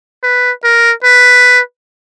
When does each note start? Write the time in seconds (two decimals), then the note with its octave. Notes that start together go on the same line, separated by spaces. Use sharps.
0.23 B4
0.64 A#4
1.04 B4